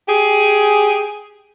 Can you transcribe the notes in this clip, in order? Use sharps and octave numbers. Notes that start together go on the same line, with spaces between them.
G4 G#4